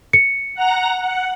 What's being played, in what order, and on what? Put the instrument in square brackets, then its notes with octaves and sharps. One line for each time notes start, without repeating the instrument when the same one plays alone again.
[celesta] C#7
[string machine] F#5 A#5 A#6
F#5